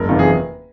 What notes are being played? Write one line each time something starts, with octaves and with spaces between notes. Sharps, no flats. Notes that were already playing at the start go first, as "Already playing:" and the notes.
Already playing: F#1 A#4
E2 C3 D#3 F4
G#4